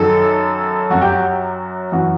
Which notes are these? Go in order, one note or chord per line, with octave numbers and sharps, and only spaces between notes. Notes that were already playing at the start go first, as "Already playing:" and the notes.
Already playing: F#2 D#3 F#3 A4
F#2 F#3 F#4
G4
F#4
F#2 E3 F#4